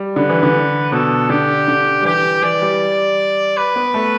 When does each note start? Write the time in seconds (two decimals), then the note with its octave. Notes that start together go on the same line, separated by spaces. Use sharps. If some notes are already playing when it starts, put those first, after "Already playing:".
Already playing: G3
0.16 D3 B4
0.29 E3
0.43 D3
0.92 B2 A4
1.30 D3 G4
1.68 D3
2.02 G3
2.05 E3 G4
2.42 E3 D5
2.62 G3
3.57 B4
3.76 B3
3.94 A3